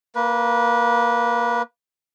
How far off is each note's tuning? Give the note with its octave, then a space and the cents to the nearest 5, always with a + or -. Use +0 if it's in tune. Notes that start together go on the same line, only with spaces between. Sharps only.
A#3 +0 B4 -25